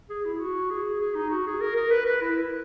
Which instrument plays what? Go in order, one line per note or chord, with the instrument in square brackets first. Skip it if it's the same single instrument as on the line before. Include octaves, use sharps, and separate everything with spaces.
[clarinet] G#4
E4
F#4
G#4
G#4
D#4
F#4
G#4
A#4
A#4
B4
B4
E4